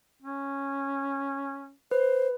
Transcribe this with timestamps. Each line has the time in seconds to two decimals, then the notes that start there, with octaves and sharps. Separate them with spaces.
0.22 C#4
1.91 B4 C5